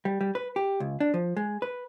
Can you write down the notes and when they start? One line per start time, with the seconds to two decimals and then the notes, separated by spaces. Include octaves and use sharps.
0.05 G3
0.21 G3
0.35 B4
0.56 G4
0.80 C#2
1.00 D4
1.14 F3
1.37 G#3
1.62 B4